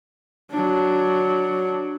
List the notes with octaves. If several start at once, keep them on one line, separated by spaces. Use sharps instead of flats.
F#3 D4